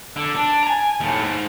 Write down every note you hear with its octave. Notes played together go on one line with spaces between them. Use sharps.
D3
D4
G#5 A#5
D#2 A2
G#2